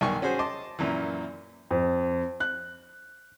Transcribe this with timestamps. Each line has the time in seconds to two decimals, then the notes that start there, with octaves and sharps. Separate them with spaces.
0.01 B1 G2 D#3 G#5 C#6
0.22 C#4 F#4 G#4 C5
0.39 D#5 A5 C6 D6
0.79 F#2 A#2 E3
1.71 F2
2.40 F#6